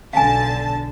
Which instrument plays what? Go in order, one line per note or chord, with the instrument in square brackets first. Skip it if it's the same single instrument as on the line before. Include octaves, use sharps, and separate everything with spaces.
[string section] B1 D3 A5 [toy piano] F5 G#5